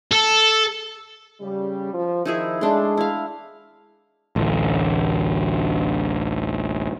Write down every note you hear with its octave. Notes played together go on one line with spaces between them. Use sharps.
A4
C#3 G3
F3
D#3 F3 D#4 E4 G#4
G#3 A3 D4 C6
E4 F5
A1 D2